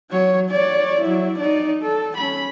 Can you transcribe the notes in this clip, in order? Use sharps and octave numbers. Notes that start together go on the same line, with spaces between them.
F#3 C#5
C#5 D5
F#3 E4
D#4 D5
A4
C#4 B5